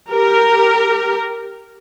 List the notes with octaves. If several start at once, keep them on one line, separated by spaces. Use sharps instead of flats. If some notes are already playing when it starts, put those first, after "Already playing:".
G4 A#4